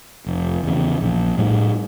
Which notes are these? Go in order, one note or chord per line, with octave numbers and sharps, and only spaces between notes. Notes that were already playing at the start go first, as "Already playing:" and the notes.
F1
E2 C#3
A#1
A2 G3